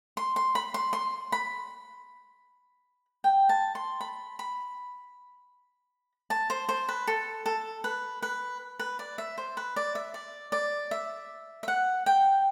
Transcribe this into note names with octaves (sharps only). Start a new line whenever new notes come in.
C6
C6
B5
C6
C6
B5
G5
A5
C6
B5
B5
A5
C5
C5
B4
A4
A4
B4
B4
B4
D5
E5
C5
B4
D5
E5
D5
D5
E5
E5
F#5
G5